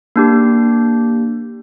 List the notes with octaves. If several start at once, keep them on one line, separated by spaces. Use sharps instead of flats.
A#3 D4 G4